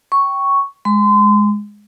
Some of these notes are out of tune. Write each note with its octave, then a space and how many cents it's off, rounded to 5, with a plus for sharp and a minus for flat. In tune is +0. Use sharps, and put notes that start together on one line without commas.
G5 -10 C#6 +0
G#3 +0 C6 -30